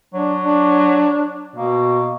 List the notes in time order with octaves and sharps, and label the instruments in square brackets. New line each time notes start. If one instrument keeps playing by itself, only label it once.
[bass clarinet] F#3 [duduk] D4
[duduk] D4
[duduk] B2 [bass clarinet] A#3